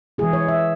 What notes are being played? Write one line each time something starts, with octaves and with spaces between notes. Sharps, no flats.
E3 G#3 E4 G#4
C#5
E5